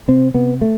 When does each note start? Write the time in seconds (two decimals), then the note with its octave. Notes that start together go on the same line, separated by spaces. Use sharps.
0.08 C3 C4
0.34 C3 B3
0.61 A3